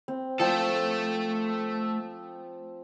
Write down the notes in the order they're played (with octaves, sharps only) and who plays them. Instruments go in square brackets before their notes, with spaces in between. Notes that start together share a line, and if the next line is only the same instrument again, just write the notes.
[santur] C4
[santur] F3 G5 [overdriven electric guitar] A3 A4